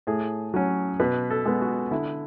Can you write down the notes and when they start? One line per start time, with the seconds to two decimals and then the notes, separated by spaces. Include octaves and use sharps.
0.07 A2 G#4
0.54 F#3 C#4
1.00 B2 B4
1.30 A4
1.45 G#3 B3
1.61 F#4
1.91 D3 E4